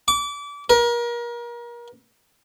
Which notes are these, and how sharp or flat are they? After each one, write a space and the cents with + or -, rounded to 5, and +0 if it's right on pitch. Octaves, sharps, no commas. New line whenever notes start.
D6 -30
A#4 +30